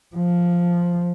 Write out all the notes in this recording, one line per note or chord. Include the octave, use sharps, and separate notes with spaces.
F3